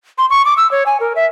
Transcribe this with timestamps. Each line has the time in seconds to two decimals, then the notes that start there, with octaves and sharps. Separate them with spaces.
0.18 C6
0.30 C#6
0.45 D6
0.57 E6
0.71 C#5
0.86 G#5
1.00 A#4
1.16 E5